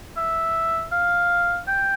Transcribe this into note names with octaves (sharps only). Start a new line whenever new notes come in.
E5
F5
G5